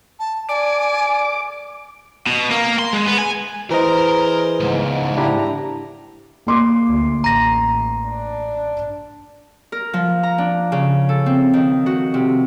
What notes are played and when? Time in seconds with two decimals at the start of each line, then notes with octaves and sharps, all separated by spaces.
0.19 A5
0.49 D5 G#5 D6
2.27 B2
2.51 A#3
2.79 C6
2.93 G#3
3.06 B3
3.18 G#5
3.70 E3 G#4 A#4 C5 D#5 A#5
4.60 C#2 G#2
5.17 D4 E4 G4 A#5
6.47 A#3 C6 D6
6.88 D2
7.24 A1 A#5 A#6
8.06 D4
9.72 A#4
9.93 F3
10.23 A#5
10.38 D4
10.72 C#3
11.09 A4
11.26 C4
11.53 D#3
11.86 F#4
12.14 C3